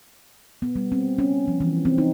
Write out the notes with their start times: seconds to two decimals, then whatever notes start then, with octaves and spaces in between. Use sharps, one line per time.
0.62 B3
0.76 G3
0.92 C4
1.18 C#4
1.48 F3
1.60 E3
1.85 C4
1.98 D#4